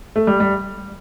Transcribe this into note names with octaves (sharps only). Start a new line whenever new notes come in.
A3
G3
G3